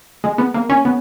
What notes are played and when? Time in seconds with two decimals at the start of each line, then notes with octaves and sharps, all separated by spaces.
0.24 G#3
0.38 B3
0.54 A#3
0.70 C#4
0.85 B3